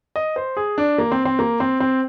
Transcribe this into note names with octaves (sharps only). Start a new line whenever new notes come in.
D#5
C5
G#4
D4
A#3
C4
C4
A#3
C4
C4